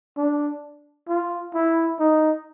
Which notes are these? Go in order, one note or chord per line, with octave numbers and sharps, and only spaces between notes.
D4
F4
E4
D#4